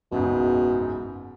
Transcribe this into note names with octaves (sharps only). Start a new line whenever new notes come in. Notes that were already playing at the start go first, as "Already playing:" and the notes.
F#1 C#2 G#2 B2